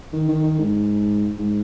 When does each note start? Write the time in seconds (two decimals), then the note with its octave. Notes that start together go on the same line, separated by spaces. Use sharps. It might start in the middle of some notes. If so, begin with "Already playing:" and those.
0.13 D#3
0.28 D#3
0.43 D#3
0.59 G#2
1.38 G#2